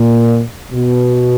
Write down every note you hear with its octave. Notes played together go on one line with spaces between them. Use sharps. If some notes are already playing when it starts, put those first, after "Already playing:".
Already playing: A#2
B2